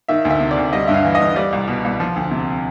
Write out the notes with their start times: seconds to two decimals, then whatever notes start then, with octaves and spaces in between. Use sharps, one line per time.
0.08 D#3 E5
0.25 D2
0.30 E5
0.40 C3
0.51 D5
0.57 D2
0.73 G3 D#5
0.87 G2 E5
0.94 F5
1.04 E3
1.15 D#5
1.20 G2
1.36 G3 D5
1.53 C2
1.68 B2
1.85 C2
2.00 F3
2.16 D2
2.31 C3